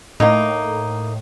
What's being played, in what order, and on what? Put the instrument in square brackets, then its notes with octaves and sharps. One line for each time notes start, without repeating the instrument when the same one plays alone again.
[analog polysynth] A2 [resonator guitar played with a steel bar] A#3 D#4